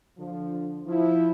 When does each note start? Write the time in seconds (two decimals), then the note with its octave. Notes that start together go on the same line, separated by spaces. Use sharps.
0.18 D3 F3
0.86 F3 E4